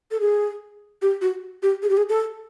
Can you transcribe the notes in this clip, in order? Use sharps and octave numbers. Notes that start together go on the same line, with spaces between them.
A4
G#4
G4
F#4
G4
G#4
G4
G#4
A4